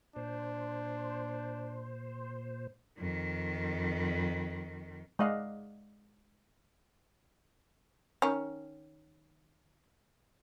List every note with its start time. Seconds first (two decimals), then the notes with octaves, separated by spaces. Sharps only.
0.16 A#2 D4 C5
2.99 F2 D#3
5.19 G#3 D5 D#5 F5 F#5
8.22 D#3 C#4